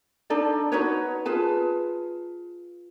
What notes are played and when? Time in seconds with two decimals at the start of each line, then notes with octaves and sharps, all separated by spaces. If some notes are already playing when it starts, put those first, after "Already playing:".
0.30 D4 D#4 A4 D5
0.72 D#4 F#4 B4 C#5
1.26 F4 G#4 B4 A5